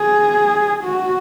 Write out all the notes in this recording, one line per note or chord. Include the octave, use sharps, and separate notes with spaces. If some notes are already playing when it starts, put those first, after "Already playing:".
Already playing: G#4
F#4